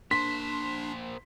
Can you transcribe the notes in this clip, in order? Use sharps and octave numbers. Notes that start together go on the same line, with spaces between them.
A#3 D4 C5 C6 B6